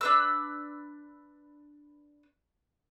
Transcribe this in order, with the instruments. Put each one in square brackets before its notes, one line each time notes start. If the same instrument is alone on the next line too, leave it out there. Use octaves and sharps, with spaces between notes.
[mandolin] D4 B4 E6